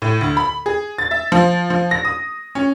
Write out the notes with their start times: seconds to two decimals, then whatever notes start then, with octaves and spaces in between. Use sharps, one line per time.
0.02 A2
0.21 D2
0.37 B5
0.66 G#4
0.98 A6
1.11 E5
1.32 F3
1.70 F3
1.91 A#6
2.05 D#6
2.55 C#4